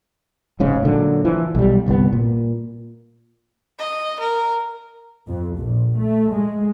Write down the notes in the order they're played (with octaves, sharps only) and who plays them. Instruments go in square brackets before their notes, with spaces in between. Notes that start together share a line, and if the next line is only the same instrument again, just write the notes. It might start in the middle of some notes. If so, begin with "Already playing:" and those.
[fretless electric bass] F1 G#2 C#3
A#2 D3 F#3
E3 F3
B1 G3
G1 C2 C#3 B3
A#2
[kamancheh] D#5
A#4
[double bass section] F2
A#1
A3
G#3